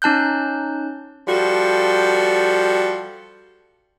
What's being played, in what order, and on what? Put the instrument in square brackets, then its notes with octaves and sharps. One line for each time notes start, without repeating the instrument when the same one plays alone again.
[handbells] C#4 D#4 A5 F#6 G6
[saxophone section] F3 G3 F#4 A4